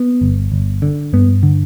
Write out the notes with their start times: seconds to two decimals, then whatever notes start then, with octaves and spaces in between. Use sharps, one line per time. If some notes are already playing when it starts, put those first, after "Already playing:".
Already playing: B3
0.21 G1
0.52 G1
0.82 D3
1.13 G2 B3
1.43 D3